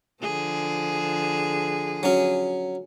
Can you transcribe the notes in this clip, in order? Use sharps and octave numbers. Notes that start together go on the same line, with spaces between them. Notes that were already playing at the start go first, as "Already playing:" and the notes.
D3 F3 G#4
F#3 C#4